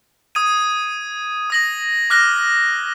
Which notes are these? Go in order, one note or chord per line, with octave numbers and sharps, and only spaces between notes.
D#6 G#6 D#7
D#6 A#6 F#7
D6 F6 F#6 A#6 G7